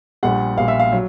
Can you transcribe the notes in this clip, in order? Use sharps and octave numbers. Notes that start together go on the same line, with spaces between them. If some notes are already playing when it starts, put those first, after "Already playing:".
A#1 A#2 G3 F#5
A#1 A#2 G3 F5
E5
F5
F#3